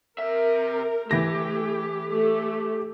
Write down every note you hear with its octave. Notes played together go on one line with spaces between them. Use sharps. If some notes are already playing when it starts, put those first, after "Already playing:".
C3 A#4 E5
E3 A3 G4 A#6
A3